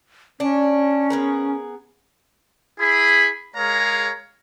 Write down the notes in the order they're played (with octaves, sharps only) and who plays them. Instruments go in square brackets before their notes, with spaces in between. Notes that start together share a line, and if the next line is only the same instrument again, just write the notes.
[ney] C#4 [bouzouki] D4
[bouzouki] B3 G#4 A#4
[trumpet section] E4 G#4 B5
G#3 G#4 A#4 C#5 F5 A#5